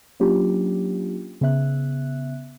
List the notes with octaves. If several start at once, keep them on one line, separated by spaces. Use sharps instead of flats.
F#3 A#3 C#4 D4 F4 G4
C#3 B3 E5 F#6